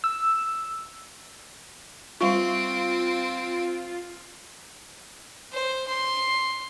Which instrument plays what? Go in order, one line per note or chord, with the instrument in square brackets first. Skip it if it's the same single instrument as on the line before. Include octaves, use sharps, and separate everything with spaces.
[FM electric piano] E6
[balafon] G3 F5 C#6 [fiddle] C4 [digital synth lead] F4
[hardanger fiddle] C5
C6